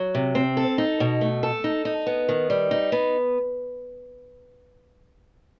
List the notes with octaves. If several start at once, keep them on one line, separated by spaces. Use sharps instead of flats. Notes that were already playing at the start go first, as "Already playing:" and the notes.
Already playing: F#3
C3
C4
A4
D#4
B2
A3
A4
D#4
D#4
B3
D#3
G3
D#4
B3